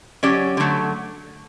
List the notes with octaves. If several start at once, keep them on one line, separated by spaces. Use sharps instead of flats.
F#3 C#4 G4 D5
D3 F#3 A3